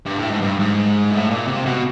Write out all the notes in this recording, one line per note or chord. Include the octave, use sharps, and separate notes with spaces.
G2
A2
G#2
G2
G#2
A2
A#2
C3
B2